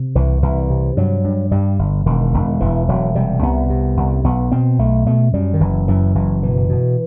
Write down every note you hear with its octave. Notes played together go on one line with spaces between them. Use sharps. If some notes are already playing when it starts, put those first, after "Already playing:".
Already playing: C3
C2 E3
C2 E3
C3
G2 F#3
G2
G2 G3
G1
E1 D#3
E1
E1 E3
E1 F#3
C3 G3
C2 B3
C3
C2
B1 B3
B2 C4
B1 A3
B2 A3
F#2 G3
D#3
F#1 E3
F#2 E3
F#1 E3
B2 E3
B2